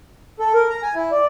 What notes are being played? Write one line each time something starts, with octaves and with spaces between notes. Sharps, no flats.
A4
A#4
A#5
G#5
E4
D5